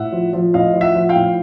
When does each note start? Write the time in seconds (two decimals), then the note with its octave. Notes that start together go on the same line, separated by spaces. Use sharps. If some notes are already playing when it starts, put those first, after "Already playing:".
Already playing: A2 E5 F#5
0.12 F3
0.33 F3
0.54 A2 D#5 F5
0.74 F3
0.81 E5 F#5
0.95 F3
1.09 F5 G5
1.16 A2